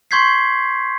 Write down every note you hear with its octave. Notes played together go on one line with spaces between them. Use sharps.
C6 C#6 G6 G#6 B6 C7